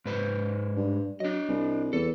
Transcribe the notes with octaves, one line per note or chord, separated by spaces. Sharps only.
G#2 B4 C5
G2
F#3 D4 D#5
C2
E2 A4